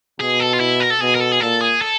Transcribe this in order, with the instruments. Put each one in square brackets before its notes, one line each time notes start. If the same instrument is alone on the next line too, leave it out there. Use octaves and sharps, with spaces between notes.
[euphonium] B2 [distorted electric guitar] G#4
[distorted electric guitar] A4
F4
E4
A#4
A4
[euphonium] B2 [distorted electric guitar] G#4
[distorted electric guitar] A#4
A4
G#4
[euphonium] A#2 [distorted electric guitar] A4
[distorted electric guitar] G#4
A4